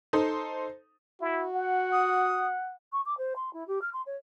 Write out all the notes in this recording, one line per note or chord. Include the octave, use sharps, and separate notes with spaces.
D#4 A4 C5
E4 F#4
F#5
D#6
C#6
D6
C5
C6
E4
G4
F6
C6
C#5